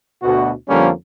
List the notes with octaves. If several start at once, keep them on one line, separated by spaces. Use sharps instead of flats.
D2 B2 F#4
F2 D3 F3 G3 A#3 C#4